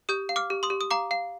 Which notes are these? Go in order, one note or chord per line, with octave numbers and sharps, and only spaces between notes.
G4 D#6 G6
F5
D6 F6
G4
C6 D#6
G4
D#6
F5 A#5 D6
F5